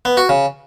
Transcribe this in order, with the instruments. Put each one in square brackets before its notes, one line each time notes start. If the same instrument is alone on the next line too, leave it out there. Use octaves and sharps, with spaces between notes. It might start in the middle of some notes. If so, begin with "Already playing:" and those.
[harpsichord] B3
F#4
C#3